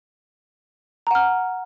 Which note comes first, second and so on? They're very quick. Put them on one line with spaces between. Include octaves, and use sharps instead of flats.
A#5 F#5 F6